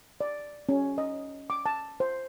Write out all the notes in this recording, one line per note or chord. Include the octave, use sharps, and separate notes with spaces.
D5
C#4
D#5
D6
A5
C5